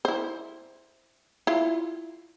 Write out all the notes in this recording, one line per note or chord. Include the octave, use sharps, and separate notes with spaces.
E4 C5
E4 F4